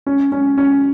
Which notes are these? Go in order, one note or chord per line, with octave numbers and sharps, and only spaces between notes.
C#4
C#4
C#4